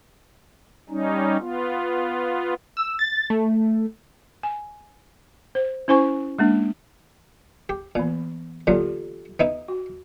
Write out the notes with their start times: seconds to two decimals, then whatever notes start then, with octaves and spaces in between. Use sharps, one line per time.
0.90 G3 C#4 D#4
1.39 B3 F4
2.77 E6
2.99 A6
3.30 A3
4.43 G#5
5.55 C5
5.88 C#4 E4 C5 G#5 C#6
6.39 G#3 A#3 D4
7.69 G4
7.95 A#2 E3 B3
8.67 A#2 D3 F#3 F4 G4 A4
9.40 B3 D#4 E4
9.68 F#4